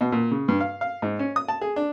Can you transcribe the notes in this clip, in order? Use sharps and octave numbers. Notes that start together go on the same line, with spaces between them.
B2
A#2
C#3
G2
F5
F5
G#2
C#4
D#6
A5
G#4
D4